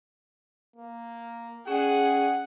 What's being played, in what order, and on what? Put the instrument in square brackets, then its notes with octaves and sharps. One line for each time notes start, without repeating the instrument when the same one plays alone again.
[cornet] A#3
[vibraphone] C#4 D5 G5 [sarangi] G#4 [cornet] F#5